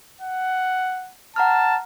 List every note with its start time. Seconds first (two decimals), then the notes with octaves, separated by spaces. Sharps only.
0.21 F#5
1.36 F#5 A5 A#5 F6